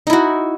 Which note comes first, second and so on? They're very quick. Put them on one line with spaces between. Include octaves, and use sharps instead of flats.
D#4 E4 F#4